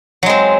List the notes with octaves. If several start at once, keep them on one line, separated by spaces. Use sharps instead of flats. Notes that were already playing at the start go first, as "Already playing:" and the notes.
F#3 G#3 C4